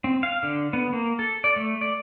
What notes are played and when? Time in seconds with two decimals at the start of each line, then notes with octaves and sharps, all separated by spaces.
0.04 C4
0.23 F5
0.43 D3
0.73 B3
0.93 A#3
1.19 A4
1.44 D5
1.56 A3
1.81 D5